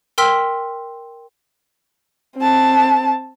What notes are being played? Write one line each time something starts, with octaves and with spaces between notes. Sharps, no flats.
A#4 G5 C6 E6 F6 B6
C4 A5